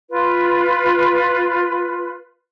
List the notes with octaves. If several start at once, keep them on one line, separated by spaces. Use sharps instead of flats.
F4 B4